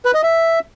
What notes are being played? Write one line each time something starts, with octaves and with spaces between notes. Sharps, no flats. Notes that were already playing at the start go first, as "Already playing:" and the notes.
B4
D#5
E5